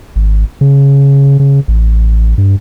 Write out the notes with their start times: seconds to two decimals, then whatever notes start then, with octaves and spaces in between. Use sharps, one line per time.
0.16 G#1
0.61 C#3
1.40 C#3
1.68 A1
2.38 G2